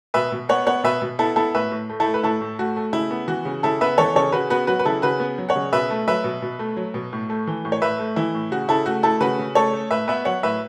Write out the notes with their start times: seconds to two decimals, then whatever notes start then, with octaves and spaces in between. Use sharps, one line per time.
0.14 B2 B4 E5
0.32 B2
0.49 B3 C#5 F#5
0.67 B3 C#5 F#5
0.84 B2 B4 E5
1.02 B2
1.19 B3 E4 A4
1.36 B3 E4 A4
1.55 A2 B4 E5
1.71 A2
1.89 A3
2.00 E4 A4
2.06 A3
2.14 B4
2.23 A2 E4 A4
2.41 A2
2.59 A3 F#4
2.77 A3
2.93 C#3 E4
3.11 B3
3.28 E3 F#4
3.45 C#3
3.63 C#3 E4 A4
3.81 B3 B4 E5
3.98 E3 A4 C#5
4.15 C#3 A4 C#5
4.32 C#3 F#4 B4
4.50 B3 F#4 B4
4.67 F#3 F#4 B4
4.79 B4
4.85 C#3 E4 A4
5.02 C#3 F#4 B4
5.20 B3
5.38 F#3
5.49 C#5 F#5
5.56 C#3
5.72 B2 B4 E5
5.90 A3
6.07 F#3 B4 E5
6.24 B2
6.42 B2
6.59 A3
6.77 F#3
6.94 B2
7.13 A2
7.30 A3
7.47 E3
7.65 A2
7.72 C#5
7.82 A2 B4 E5
7.99 A3
8.16 E3 E4
8.34 A2
8.52 C#3 F#4
8.68 C#3 E4 A4
8.86 A3 F#4
9.03 A3 E4 A4
9.21 C#3 F#4 B4
9.39 C#3
9.55 A3 A4 C#5
9.73 A3
9.91 A2 B4 E5
10.08 B3 B4 E5
10.25 F#3 C#5 F#5
10.43 A2 B4 E5